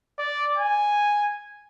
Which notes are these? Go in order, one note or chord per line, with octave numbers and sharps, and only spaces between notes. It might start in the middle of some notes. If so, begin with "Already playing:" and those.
D5
G#5